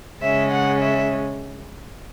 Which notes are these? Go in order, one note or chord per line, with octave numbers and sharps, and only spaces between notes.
C#3 G#3 C#4 E5
F#5
E5